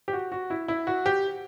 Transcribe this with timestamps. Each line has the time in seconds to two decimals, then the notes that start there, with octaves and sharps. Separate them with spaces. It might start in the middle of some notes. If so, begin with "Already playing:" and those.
0.08 G4
0.13 F#4
0.32 F#4
0.50 E4
0.68 E4
0.87 F#4
1.06 G4